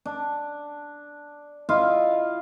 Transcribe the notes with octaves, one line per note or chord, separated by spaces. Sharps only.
D4
E4 F4 D#5 F5